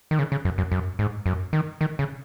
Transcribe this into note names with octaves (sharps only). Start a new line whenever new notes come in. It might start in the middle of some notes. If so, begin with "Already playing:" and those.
D#3
C#3
C#3
F#2
F#2
F#2
G#2
F#2
D#3
D#3
C#3